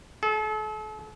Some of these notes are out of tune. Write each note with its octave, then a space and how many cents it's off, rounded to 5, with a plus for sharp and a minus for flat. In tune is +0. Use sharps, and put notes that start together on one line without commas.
A4 -40